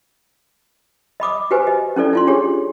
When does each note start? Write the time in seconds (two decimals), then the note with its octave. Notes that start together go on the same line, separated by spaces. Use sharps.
1.20 D#5 B5 D6 D#6
1.51 F#4 G4 B4 C5 G#5
1.67 D#5
1.96 C#4 E4 A4 D5
2.13 D#4 F4 C6
2.27 D4 G4 G#4 C#5